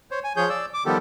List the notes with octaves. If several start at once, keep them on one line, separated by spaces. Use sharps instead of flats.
C5 C#5
G#5
F3 G#4 C#5 G6
D5 E6
D6
D#3 F3 G3 B3 G4 A4